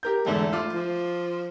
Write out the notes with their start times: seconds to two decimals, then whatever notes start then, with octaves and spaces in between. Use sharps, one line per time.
0.03 G4 A#4 G6
0.26 E2 G#2 D3 A3
0.53 F4 D6
0.73 F3